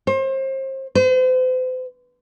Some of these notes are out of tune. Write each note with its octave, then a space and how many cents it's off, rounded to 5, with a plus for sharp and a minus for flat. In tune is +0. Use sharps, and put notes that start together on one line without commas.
C5 +35
C5 -40